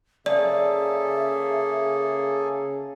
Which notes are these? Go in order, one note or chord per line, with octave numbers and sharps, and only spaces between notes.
C#3 A#3 G#4 A4 D5 E5